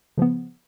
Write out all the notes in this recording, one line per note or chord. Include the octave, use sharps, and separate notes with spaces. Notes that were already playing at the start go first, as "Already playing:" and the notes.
C#3 F3 B3